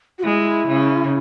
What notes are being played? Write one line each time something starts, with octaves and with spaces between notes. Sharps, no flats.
F#4
G#3 E4
C#3